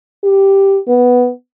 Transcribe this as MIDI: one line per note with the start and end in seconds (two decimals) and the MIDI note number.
0.24 0.79 67
0.88 1.30 59